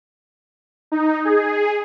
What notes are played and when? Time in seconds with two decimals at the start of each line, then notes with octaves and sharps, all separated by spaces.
0.92 D#4
1.25 G#4